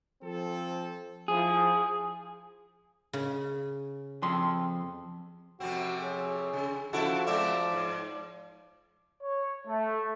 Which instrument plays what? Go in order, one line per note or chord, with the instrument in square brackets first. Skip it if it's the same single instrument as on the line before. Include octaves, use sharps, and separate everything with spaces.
[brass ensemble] F3 C4 A4
[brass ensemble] F3 E4 [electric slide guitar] G#4
[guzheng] C#3
[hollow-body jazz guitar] F2 C6
[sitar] F2 C3 C4 [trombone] F#4
[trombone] G#4 [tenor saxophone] C#5
[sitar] C#3
[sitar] C#3 E4 A4 [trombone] F3 [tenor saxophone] F#4
[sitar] G#3 C4 E5 [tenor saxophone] D5
[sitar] G#2
[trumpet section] C#5
A3